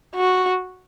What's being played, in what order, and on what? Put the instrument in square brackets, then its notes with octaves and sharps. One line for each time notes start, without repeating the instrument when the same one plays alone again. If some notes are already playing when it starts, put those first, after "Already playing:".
[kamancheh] F#4